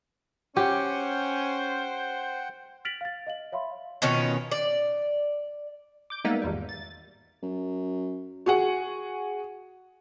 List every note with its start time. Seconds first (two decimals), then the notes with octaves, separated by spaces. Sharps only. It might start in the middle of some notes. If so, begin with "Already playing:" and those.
0.57 C#4 G4 C5 F#5 G5
2.85 F6 A6 B6 D7 F7 F#7
3.01 F5 A6
3.27 D#5 F5 F#7
3.52 C#5 E5 F5 B5 C6
4.02 B2 D#3 C#4 F4
4.52 D5
6.10 D6 G6
6.24 G3 G#3 A#3 B3 D#4 E5
6.42 G#1 E2 G3
6.69 A6
7.42 F#2
8.46 F#4 G#4 F#5